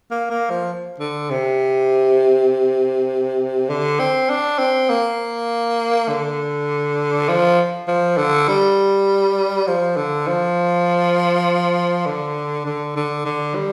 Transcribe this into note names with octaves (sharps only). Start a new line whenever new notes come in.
A#3
A#3
F3
D3
C3
D3
C4
D4
C4
A#3
D3
F3
F3
D3
G3
F3
D3
F3
D3
D3
D3
D3
G3